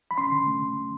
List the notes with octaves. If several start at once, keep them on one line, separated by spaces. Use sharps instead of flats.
B5
C#4 C6
D3
A3